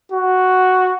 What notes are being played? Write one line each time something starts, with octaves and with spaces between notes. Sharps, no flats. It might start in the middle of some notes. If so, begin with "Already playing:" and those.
F#4